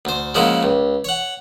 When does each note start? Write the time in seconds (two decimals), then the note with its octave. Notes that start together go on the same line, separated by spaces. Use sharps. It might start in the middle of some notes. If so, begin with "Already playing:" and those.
0.05 D2 C5
0.35 C#3 F3 G#3 A#3 E4 F#4
0.63 C#2
1.04 C#5 F#5